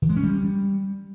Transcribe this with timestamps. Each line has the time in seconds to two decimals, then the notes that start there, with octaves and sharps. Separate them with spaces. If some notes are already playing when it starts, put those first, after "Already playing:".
0.02 E3
0.09 G#3
0.16 C#4
0.24 G3